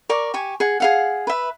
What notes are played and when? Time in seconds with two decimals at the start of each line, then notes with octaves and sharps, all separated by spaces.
0.09 A#4 D5 C#6 D6
0.34 G4 G#5 C#6
0.60 G#4 F#5
0.80 G#4 F5 F#5
1.27 B4 E5